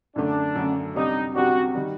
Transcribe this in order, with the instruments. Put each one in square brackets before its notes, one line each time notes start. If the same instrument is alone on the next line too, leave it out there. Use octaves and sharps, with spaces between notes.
[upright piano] F#2 D3 A3 [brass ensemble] D4
[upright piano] F#2 D3 A3
[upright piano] C2 C3 G3 D4 G4 [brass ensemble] D#4
[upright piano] C2 C3 G3 D4 G4 [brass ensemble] F#4
[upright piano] D#3 G3